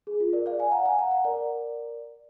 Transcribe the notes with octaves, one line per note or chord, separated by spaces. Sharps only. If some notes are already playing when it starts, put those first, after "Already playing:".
G#4
F4
A#4 D5
D5 F5
F5 G#5
F#5 A#5
F5 G#5
F#5 A#5
F#5 A#5
A#4 D5